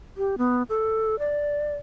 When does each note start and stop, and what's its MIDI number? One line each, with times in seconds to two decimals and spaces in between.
0.17 0.35 67
0.38 0.63 59
0.69 1.18 69
1.19 1.74 74